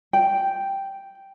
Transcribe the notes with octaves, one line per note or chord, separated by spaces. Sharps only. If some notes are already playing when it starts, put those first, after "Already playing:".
G5